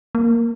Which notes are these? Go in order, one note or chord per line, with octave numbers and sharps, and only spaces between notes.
A#3